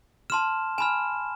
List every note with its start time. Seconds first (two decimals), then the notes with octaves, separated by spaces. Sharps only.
0.30 A5 C6 F6 E7
0.78 G#5 B5 F6 E7